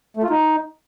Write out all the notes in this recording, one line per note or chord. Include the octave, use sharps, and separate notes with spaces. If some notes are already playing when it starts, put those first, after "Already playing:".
A3
F4
D#4